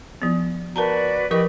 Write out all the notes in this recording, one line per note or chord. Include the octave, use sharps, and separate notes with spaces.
F3 B3
F#4 A#4 B4 D5 A5 A#5
F3 G4 A#4 B4 D#5 C#6